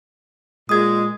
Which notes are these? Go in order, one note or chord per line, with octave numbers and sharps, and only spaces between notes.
A#2 G#3 D#6 G#6